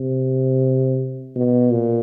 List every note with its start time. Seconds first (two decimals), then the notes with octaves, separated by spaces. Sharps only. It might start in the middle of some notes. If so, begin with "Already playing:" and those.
Already playing: C3
1.35 B2
1.71 A#2